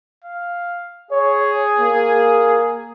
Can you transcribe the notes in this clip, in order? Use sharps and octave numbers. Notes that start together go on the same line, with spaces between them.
F5
G#4 C#5
A#3